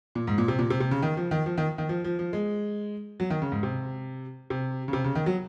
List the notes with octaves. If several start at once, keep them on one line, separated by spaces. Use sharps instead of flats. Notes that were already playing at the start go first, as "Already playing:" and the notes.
A#2
G#2
A#2
C3
A#2
C3
C3
C#3
D#3
F3
D#3
F3
D#3
D#3
F3
F3
F3
G#3
F#3
D#3
C#3
G#2
C3
C3
C#3
C3
C#3
D#3
F#3